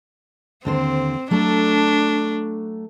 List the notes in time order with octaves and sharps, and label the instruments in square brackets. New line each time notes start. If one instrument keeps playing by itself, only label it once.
[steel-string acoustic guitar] D#2 D3 C5 [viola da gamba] C4
[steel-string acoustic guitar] F#3 A3 A4 [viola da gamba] D4